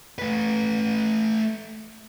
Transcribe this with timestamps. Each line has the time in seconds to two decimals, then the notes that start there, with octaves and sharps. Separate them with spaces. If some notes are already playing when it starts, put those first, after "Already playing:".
0.19 A3 B4